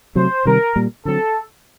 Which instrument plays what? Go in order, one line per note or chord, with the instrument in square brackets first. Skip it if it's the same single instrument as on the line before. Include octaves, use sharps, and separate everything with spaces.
[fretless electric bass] C3 F#3 A3 [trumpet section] C5
[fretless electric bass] C3 D#3 G3 C4 [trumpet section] A#4
[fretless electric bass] A#2 G3 A#3
[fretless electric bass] D3 F#3 C4 [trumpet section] A4